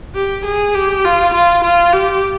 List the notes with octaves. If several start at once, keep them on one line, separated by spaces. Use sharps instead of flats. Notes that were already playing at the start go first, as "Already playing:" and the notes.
G4
G#4
G4
F4
F4
F4
G4